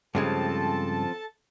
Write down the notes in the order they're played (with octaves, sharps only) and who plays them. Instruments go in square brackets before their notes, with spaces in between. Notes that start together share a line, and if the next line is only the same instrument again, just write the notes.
[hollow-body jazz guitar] G2 C#3 G#3 [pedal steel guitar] F3 C4 [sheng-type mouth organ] A4 A5